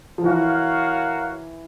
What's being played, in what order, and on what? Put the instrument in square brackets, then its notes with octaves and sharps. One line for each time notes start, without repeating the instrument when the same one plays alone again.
[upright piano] F3
[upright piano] E3 [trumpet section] F#4 A#4 C#5 F5